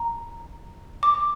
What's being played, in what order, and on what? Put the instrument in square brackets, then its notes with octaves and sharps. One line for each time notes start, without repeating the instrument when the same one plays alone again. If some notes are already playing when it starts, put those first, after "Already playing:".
Already playing: [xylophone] A#5
D6